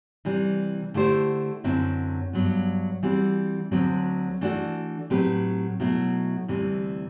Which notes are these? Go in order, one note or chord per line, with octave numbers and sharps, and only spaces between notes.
C3 E3 G3
D3 A3 E4 G4 C5
F#2 D3 F#3 C4 E4
G2 F#3 B3
E3 G3 C4 F#4
D2 D3 F#3 C4
E3 A3 D4 F#4 A4
A2 F#3 C4 G4 B4
B2 F#3 A3 E4
D2 C3 E3 G3